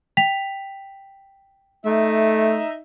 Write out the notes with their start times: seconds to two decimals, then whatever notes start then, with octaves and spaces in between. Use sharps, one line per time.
0.17 G5 B6 F7
1.85 A3 D#4 E5